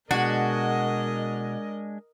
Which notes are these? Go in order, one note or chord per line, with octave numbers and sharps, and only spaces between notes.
B2 G#3 D4 F#4 A#4 D#5